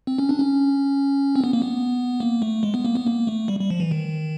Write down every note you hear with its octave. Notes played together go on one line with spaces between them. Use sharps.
C4
C#4
D4
C#4
C4
B3
A#3
B3
A#3
A3
G#3
B3
A#3
B3
A#3
A3
G3
G3
F3
E3
D#3